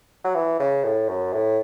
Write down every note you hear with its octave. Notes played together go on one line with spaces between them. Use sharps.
F#3
E3
C#3
A2
F#2
A2